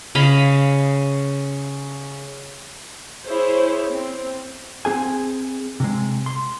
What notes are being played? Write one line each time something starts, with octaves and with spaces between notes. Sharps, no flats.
C#3 D#5 F5 B5
E4 G#4 C5 C#5
C4
C4 G#4 G#5
C3 G#3
C6